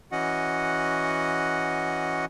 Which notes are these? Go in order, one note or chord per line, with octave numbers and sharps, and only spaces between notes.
E3 C#4 F#4 D#5 F#5